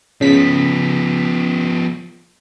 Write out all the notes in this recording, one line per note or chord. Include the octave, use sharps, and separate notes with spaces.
C#3 F3 B3 B6